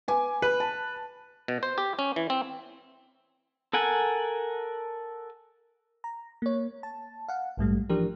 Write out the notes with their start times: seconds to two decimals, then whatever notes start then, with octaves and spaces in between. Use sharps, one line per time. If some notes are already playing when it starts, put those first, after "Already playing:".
0.08 B4 G#5 D6
0.42 B4 B5
0.60 A5
1.48 B2
1.63 C5
1.78 G4
1.99 C#4
2.16 E3
2.30 C4
3.73 A4 A#4 F#5 G#5
6.04 A#5
6.42 A#3 C#5
6.83 A5
7.28 F5 F#5
7.57 A#1 G#2 G3 A3
7.89 E3 F3 D4 G4 A#4